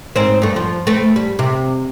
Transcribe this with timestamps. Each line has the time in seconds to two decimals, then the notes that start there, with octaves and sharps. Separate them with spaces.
0.16 G#2 C4 C5
0.42 G2 A3
0.56 F3
0.87 A3 C4 B4
1.16 G3
1.39 C3